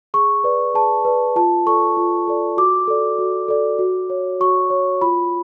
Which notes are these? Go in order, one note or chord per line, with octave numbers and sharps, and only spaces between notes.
G#4 C#6
B4 D5
G#4 A5
B4 D5
F4 A5
A4 D5 C#6
F4
A4 D5
F#4 D6
A4 D5
F#4
A4 D5
F#4
C#5
F#4 C#6
C#5
F4 B5